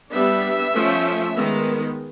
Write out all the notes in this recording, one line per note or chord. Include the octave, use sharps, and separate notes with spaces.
G3 B3 D4 E5
F3 A3 C#4
D#3 G#3 B3